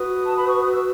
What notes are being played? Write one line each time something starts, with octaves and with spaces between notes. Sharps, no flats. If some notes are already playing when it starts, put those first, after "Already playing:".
Already playing: F#4 B4 D#6
A5
B5
C#6
D#6
E6